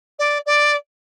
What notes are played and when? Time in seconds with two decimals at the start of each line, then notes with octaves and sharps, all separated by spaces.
0.19 D5
0.46 D5